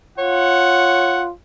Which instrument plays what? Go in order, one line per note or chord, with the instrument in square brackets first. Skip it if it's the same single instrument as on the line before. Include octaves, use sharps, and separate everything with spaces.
[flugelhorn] F4 [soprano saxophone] C#5 [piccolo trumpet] F#5